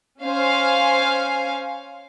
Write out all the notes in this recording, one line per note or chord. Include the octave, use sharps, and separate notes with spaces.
C#4 C5 F5 G#5